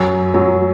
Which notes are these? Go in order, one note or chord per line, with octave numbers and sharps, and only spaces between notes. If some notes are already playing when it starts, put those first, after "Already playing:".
Already playing: F#2 F#3
F#2 F#3